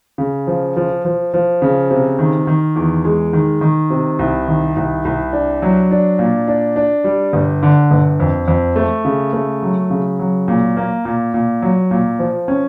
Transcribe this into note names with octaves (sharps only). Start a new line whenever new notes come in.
C#3
F3
F3
F3
F3
C#3
C3
D#3
D#3
E2
G#3
D#3
D#3
C3
C2
D#3
C2
C2
D4
F#3
D4
A#2
D4
D4
G3
G1
D3
G1
F2
F2
A3
C#3
A3
F#3
C#3
F#3
A#2
A#3
A#2
A#2
F#3
A#2
F3
C#4